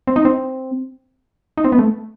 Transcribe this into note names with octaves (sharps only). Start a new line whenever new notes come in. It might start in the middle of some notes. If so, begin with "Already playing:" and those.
C4
D#4
C4
D#4
C4
B3
A3